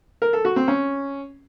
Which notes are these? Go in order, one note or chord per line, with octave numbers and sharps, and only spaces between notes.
A#4
A4
F#4
C4
C#4